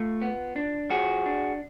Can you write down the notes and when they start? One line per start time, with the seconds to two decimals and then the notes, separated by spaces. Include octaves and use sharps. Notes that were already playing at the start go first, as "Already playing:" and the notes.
Already playing: A3 F4
0.22 B3
0.56 D4
0.90 F3 F#4 G#4
1.25 D4